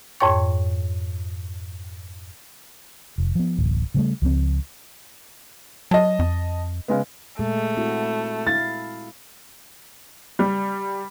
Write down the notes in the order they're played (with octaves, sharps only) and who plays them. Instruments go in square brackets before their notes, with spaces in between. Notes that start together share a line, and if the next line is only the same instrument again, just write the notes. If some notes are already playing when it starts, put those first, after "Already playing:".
[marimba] F2 G#2 C#5 G5 C#6
[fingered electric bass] F1
F3 B3
D1 A1
C#3 G3 A3
C#2 F3 G3 C4
[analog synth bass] F#3 [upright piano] D#5 A5
[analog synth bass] F2
[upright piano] C#3 G#3 B3
[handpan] A#2 G#3 G#4 [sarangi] A3
[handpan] C4 E4 F#4
[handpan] E4 F5 [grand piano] A6
[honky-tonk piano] G3